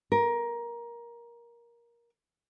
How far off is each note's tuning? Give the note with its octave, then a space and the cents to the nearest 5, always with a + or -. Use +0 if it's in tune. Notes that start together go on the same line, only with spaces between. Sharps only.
A#4 +15